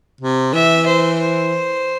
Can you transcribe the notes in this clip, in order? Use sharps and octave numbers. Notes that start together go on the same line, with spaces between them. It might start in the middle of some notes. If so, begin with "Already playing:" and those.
C3
E3 E5
C5
C5